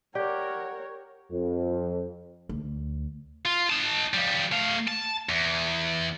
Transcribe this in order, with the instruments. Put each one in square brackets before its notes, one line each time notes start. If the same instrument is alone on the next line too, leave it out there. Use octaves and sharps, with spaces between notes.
[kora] G4 [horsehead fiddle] A#4 C#5 [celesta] D5 [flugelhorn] F#5
[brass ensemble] F2
[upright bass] D2
[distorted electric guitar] F4
D#4 A5
F3 G3
A3 F5
A5
E2